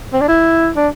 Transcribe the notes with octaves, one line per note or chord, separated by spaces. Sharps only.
C4
D4
E4
D4